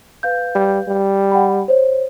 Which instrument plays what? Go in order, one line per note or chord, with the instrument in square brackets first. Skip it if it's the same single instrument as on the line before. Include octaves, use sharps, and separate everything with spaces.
[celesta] B4 F5 G6
[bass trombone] G3
G3
[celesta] F#5 G5 B5
C5 C#5